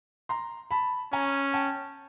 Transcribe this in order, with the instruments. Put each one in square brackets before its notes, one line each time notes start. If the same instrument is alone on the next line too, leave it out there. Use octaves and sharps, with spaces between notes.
[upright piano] A#5 C6
A5 B5
[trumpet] C#4 [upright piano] G#5 A#5
[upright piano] G5 A5